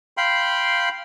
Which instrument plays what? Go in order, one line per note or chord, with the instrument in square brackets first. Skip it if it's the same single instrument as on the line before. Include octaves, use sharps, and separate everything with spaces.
[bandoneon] F5 G5 B5 C6